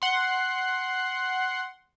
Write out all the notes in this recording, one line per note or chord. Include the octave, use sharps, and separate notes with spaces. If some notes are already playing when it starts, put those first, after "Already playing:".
F#5 C6